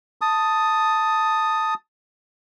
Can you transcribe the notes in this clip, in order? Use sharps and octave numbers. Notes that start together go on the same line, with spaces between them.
A5 D#6